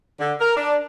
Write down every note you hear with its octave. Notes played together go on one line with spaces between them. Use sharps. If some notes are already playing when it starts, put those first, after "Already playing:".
D3
A#4
D4